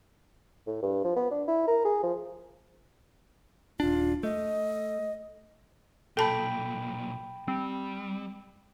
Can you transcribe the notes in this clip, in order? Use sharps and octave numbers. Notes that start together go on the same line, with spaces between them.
A2
G2
F3
B3
D4
E4
A#4
G#4
F3
D#1 D4 F4
A3 D#5
B1 A#2 A4 G5 A5 B5
G3 C4